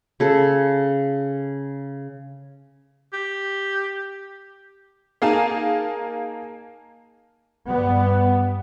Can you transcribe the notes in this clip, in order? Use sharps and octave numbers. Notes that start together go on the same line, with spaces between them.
C#3 A4
G4
A#3 D#4 G#4 F5 G#5 A5
G2 G3 B3